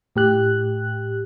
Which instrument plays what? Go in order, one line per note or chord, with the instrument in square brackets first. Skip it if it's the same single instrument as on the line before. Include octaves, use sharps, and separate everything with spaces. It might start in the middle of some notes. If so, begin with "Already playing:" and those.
[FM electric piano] A2 G4 F#6